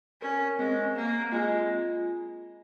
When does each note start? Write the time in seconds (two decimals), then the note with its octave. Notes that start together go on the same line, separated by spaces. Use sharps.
0.22 C#4 A#4
0.59 G#3 C4
0.96 A#3 C4
1.32 G#3 F4